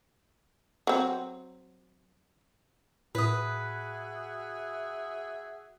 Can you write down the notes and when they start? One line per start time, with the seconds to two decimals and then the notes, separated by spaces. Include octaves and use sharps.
0.87 F#3 C4
3.15 A2 F#4 G#4 B4 E5 D#6